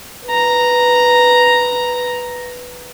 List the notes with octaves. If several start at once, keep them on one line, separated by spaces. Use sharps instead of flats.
B4 A#5